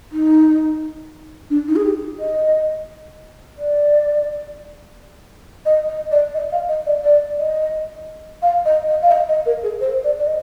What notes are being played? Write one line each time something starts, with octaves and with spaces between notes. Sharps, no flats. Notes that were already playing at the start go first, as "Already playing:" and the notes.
D#4
D4
D#4
G#4
G4
D#5
D5
D#5
D#5
D5
D#5
F5
D#5
D5
D5
D#5
F5
D#5
D#5
F5
D#5
D#5
A#4
G#4
C5
D5
D5
D#5